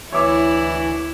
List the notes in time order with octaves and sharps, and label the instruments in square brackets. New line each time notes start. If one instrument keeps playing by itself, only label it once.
[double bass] D2 [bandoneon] E3 [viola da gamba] E4 [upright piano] C#5 E5 D6